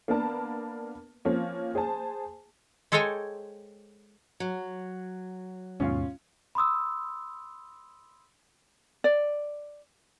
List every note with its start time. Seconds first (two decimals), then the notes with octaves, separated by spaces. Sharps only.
0.08 A#3 B3 D4 A#4 B4 A5
1.25 F3 A#3 C4 C#4
1.75 G#4 C5 G#5 A5
2.92 G#3 A4 C5 C#5 G5 G#5
4.40 F#3
5.80 D#2 G#2 B2 C#4 F4 F5
6.55 B5 C6 D#6 E6
9.04 D5